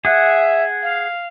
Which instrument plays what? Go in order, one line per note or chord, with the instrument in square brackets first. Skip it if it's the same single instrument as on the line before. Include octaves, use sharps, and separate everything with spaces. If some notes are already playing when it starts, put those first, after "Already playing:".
[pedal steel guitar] G#4 F#5 [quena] E5
[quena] F5